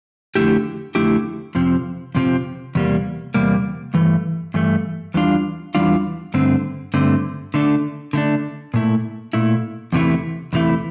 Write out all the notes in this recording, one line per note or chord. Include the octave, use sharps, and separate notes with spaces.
F2 D3 A3 E4 G4
F2 D3 A3 E4 G4
F2 C3 F3 C4
F2 C3 F3 C4
E2 C3 G3 A#3
E2 C3 G3 A#3
G2 E3 A3
G2 E3 A3
E2 E3 G3 D4 F4
E2 E3 G3 D4 F4
G2 D3 A3 C4
G2 D3 A3 C4
D3 A3 D4
D3 A3 D4
A#2 A3 E4
A#2 A3 E4
E2 C3 E3 A3 E4
E2 C3 E3 A3 E4